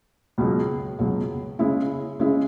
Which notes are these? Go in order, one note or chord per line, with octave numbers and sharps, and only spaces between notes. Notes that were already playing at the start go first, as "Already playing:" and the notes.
C#2 B2 F#3
C#2 B2 F#3
C#3 G#3 C#4 E4
C#3 G#3 C#4 E4